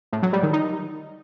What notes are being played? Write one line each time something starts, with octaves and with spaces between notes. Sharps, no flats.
A2
F#3
G3
D#3
D#4